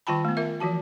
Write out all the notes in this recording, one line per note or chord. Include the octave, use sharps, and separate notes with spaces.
D#3 G3 F4 G5 A5 B5
A3 B3
F4 A#4 E5
E3 F3 F#4 A5